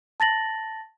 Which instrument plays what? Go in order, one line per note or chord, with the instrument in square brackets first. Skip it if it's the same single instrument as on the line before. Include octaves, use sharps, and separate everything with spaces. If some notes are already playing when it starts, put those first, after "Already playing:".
[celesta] A5 A6 A#6 F#7